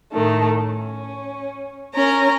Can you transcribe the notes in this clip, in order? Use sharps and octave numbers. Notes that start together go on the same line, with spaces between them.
A2 D#3 A3
C#4
C#4 A#4 A#5